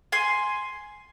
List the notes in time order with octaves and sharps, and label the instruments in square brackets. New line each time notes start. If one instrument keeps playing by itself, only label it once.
[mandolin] G#5 C6